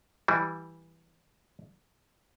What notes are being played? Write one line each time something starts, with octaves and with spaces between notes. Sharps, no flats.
E3 G3